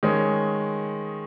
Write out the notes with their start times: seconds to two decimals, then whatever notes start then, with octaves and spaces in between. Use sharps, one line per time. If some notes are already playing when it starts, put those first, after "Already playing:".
0.03 D#3 G#3 C#4